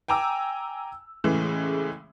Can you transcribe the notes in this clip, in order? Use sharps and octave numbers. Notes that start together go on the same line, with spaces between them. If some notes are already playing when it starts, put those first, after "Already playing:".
G5 G#5 A#5 D6 E6
A2 C#3 E3 G#3